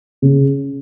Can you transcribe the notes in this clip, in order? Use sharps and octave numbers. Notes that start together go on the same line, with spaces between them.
C#3